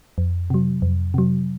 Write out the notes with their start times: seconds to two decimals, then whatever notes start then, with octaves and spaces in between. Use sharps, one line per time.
0.18 F2
0.50 C3 F#3
0.82 F2
1.14 C3 F#3